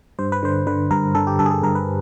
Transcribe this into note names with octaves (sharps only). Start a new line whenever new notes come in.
G2 C5
B4
D3 C5
D3 B4
G2 A#4
D3 A4
G4
G2 A4
G#4
A4
G2 A#4
B4